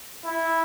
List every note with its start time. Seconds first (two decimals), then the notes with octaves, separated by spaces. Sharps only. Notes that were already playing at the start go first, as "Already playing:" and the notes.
0.25 E4